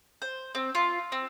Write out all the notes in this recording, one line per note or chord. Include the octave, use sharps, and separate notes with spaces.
C5
C4
F4
C4